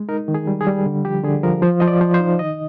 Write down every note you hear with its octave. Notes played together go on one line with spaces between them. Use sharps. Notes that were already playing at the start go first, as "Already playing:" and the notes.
Already playing: G#3
D#4 A#4
D#3
G#4
G3
G#4
G3
D3
F3 G4
D3 G#4
F3 A#4
F3 C5
F3 D#5
D5
F3
C5
D#4
D#3 D#5